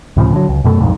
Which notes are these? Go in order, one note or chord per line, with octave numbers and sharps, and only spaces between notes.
D2 A2 C#3 F3
D3 F#3
C#2
F#2 B2 A3
B1 F2 G#2